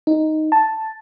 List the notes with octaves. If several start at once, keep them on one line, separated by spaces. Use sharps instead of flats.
D#4
A5